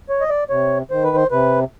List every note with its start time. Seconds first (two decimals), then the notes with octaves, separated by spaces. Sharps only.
0.09 C#5
0.21 D#5
0.30 D5
0.50 C3 C#5
0.91 D#3 C5
1.04 B4
1.17 C5
1.31 C3 B4